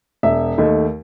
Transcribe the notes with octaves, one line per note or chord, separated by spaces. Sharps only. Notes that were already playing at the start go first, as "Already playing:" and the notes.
E1 E5
D#2 D#3 A3